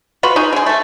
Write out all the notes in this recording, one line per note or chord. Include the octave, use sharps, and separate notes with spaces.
F4 F#4 B4
D#4 F#4 G#4
D3 G#4
A3 A4